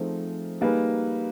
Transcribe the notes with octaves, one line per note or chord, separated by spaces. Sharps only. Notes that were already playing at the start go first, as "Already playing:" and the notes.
Already playing: F3 A3 C4 D#4 G#4
G3 A#3 D#4 G#4 B4